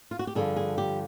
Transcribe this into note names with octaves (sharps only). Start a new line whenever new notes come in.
F4
F#4
G4
G2 D3 F3 G#4
G#4
G4